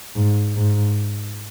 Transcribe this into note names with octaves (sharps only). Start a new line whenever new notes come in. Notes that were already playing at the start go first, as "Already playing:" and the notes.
G#2
G#2